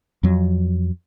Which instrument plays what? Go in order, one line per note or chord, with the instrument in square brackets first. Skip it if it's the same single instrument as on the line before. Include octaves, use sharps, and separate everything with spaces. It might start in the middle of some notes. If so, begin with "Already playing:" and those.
[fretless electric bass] F2 F#3